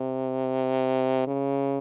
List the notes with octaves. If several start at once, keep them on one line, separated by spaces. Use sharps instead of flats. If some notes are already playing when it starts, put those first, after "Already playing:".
Already playing: C3
C#3